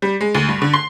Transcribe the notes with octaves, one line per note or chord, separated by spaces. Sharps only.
G3
G#3
D2
G2
D3
C6